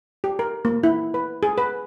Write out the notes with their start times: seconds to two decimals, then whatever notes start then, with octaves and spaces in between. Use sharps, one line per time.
0.24 G4
0.39 A#4
0.65 A#3
0.83 E4
1.14 B4
1.43 G#4
1.58 B4